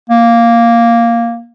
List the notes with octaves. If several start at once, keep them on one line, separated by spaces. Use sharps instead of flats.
A#3